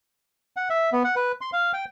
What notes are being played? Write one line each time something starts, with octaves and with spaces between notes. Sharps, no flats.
F#5
E5
B3
F#5
B4
C6
F5
G5